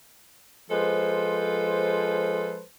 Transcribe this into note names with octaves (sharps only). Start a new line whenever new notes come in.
F3 G#3 A4 B4 C5